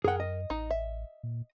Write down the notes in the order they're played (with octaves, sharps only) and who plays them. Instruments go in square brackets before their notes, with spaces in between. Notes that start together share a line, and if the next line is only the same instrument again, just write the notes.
[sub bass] F#2 [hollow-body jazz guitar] G#4 F#5 [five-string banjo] A#4 G5
[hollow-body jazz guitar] D#5
[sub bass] A1 [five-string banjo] D#4
[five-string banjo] E5
[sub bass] A#2